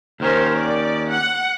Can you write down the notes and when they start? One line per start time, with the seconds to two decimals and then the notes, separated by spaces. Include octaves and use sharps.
0.20 D#2 D#3 C#4 A#4 C5
0.58 D5
1.10 F#5